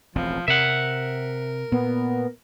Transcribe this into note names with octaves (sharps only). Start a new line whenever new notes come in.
E1 A1 F3 C4
C3 A#4 E5 F#5
A#2 B3